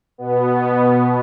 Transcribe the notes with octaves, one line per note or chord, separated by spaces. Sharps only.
B2 B3